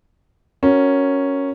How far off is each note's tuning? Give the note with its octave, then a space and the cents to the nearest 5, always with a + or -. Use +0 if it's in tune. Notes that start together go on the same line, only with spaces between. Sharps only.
C#4 +0 F#4 +0 A#4 +0